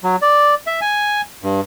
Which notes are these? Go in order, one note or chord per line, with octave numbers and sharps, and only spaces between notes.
F#3
D5
E5
G#5
G2